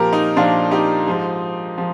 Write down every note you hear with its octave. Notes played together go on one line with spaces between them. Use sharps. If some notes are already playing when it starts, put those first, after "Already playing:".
Already playing: A#2 F3 G4 A#4
D#4
A#2 F3 D4 F4
D#4 G4
G#2 F3
F3